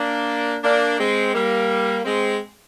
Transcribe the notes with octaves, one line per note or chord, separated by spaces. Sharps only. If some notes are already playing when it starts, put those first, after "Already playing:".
Already playing: A#3 D4
A#3 D4
G#3 C4
G3 A#3
G#3 C4